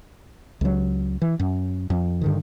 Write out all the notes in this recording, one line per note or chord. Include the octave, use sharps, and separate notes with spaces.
C#2 F#3
E3
F#2
F2
G2 D3 D#3